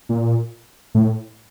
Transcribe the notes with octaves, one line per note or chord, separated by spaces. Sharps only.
A#2
A2